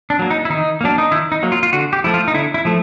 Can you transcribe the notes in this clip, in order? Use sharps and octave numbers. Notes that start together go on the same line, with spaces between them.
D4
F#3 A#3
D#4
E4
D#3 D#4
F#3 A#3 D4
D#4
D#3 E4
D#4
F#3 A#3
F4
F4
D3 F#4
G4
F3 A3 E4
F4
D#4
D3 E4
E4
F3 A3